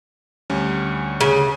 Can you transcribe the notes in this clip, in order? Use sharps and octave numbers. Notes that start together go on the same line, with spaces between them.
D2 G3 C#4
C#3